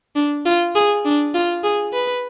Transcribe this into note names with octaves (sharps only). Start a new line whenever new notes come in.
D4
F4
G#4
D4
F4
G#4
B4